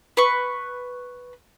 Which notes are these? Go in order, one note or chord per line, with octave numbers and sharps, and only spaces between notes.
B4 C#6